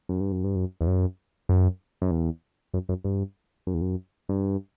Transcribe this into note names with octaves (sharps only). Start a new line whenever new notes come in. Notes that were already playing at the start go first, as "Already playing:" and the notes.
F#2
G2
F#2
G2
F#2
E2
F#2
F#2
F#2
E2
F#2
F#2
G2
F#2
E2
F#2
G2